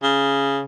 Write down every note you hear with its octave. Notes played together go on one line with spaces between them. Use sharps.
C#3